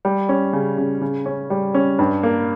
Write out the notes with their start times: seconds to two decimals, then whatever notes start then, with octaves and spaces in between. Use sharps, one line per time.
0.05 G3
0.29 C#4
0.53 C#3
0.78 C#3
1.01 C#3
1.26 C#4
1.50 G3
1.74 C#4
1.99 G2
2.23 A#3